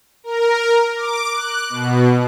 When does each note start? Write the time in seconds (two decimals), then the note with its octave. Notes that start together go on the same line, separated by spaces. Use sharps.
0.24 A#4
0.96 D6
1.33 F#6
1.70 B2